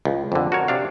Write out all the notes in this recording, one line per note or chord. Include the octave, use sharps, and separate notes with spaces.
C#2
F2 D3
F#4 A#4 C#5
C3 D4 F5